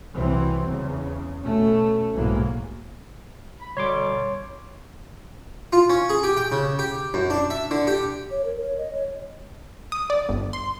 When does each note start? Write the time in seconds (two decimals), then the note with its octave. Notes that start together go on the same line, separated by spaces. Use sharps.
0.13 C2 E3 F#3 C4
0.66 E2 C#3
1.41 B2 A3 C#4
2.14 B1 G#2 B2 E3 F#3 A#3
3.60 B5
3.77 B2 D3 G3 C#5 C6 D6
5.73 F4
5.90 C#4
6.09 G#4
6.23 G4
6.37 G5
6.52 C#3
6.79 G4
7.14 F#2
7.30 D4
7.50 E5
7.71 D3
7.87 G4
8.31 C#5
8.45 A#4
8.62 C#5
8.78 D#5
8.94 C#5
9.92 D#6
10.10 D5
10.29 G1
10.53 C6